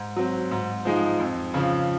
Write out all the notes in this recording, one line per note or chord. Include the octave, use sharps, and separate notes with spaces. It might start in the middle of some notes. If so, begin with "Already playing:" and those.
Already playing: G#2
F#3 C4
G#2
F3 G#3 D#4
F2
C#3 F3